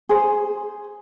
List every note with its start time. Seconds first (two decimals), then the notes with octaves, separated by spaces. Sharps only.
0.09 G#4 C5